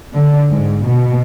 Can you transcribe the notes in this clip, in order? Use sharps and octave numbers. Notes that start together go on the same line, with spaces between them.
D3
G#2
B2